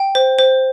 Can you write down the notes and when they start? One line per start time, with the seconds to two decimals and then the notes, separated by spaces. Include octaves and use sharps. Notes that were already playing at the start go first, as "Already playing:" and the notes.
Already playing: G5
0.15 C5
0.39 C5